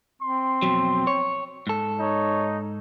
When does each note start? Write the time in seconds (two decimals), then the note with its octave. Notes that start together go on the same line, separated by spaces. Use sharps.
0.21 C4 C6
0.62 F2 B2 F#3
1.07 C#5
1.67 G#2 A4
1.99 D#4 C#5